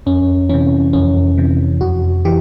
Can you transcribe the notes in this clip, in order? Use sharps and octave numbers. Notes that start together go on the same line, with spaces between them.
F2 C#4
C3 E3 C#4
F2 C#4
C3 E3
F2 F#4
E3 G4